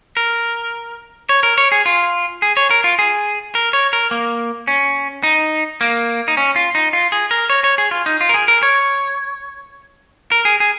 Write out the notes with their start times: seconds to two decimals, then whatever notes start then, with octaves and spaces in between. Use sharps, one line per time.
0.17 A#4
1.29 C#5
1.43 A#4
1.58 C#5
1.72 G#4
1.86 F4
2.42 G#4
2.57 C#5
2.71 A#4
2.84 F4
2.99 G#4
3.55 A#4
3.73 C#5
3.93 A#4
4.11 A#3
4.67 C#4
5.23 D#4
5.81 A#3
6.28 D#4
6.37 C#4
6.56 F4
6.75 D#4
6.93 F4
7.12 G#4
7.31 A#4
7.50 C#5
7.64 C#5
7.78 G#4
7.91 F4
8.06 D#4
8.21 F4
8.29 A#4
8.34 G#4
8.48 A#4
8.63 C#5
10.32 A#4
10.45 G#4
10.60 G#4